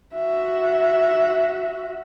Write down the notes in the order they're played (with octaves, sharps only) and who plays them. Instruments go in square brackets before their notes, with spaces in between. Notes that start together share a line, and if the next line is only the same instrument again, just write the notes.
[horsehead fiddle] F#4 E5